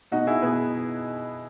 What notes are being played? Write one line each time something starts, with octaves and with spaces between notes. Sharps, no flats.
B2 D#4 F#4
E4 G#4
B2 G#4 B4